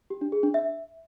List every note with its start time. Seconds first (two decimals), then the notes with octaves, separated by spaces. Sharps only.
0.10 G4
0.21 D4
0.32 G#4
0.43 D4
0.54 E5